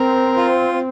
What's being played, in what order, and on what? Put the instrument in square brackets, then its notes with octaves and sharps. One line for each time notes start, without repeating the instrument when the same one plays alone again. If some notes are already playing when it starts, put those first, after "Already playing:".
Already playing: [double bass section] C4 [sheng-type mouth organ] A#4
[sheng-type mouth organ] F4